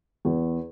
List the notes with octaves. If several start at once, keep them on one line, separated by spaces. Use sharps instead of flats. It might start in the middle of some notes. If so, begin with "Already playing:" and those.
E2